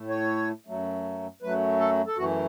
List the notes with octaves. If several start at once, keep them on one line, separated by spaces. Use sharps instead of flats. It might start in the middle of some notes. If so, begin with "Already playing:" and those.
Already playing: A2 A3
C#5
F#2 F#3 A3
F#2 F#3 A3 B4
A4
A4
F#2 E3 A3 F#4